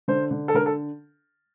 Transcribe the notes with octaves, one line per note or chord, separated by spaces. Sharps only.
D3 C5
D3
A4
D3 A#4
A4